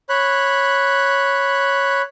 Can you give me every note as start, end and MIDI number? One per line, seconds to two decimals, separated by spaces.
0.09 2.02 73
0.09 2.02 83
0.09 2.02 90